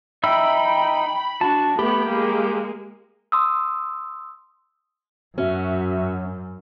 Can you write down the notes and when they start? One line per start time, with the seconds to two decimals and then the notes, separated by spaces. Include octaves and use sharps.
0.24 D#4 E5 G5 B5 E6
1.41 D4 F#4 A5
1.79 A3 B3 G4 B5
2.08 G#3 A#3
3.32 C6 D#6 E6
5.38 F#2 C#4 F#4 E5